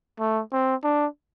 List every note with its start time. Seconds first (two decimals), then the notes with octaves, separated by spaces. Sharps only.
0.19 A3
0.53 C4
0.84 D4